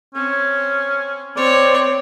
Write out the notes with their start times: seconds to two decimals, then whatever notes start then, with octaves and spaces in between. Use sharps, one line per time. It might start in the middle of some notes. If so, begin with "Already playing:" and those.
0.15 C4 C#4
1.37 C4 C#5 D5